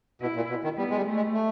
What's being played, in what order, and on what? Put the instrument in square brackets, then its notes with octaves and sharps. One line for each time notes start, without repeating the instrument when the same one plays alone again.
[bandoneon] B2 [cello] E4
[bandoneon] A#2
B2
D#3
[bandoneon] G3 [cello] B3
[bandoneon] G#3
G3
[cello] A3
[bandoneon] G#3
A3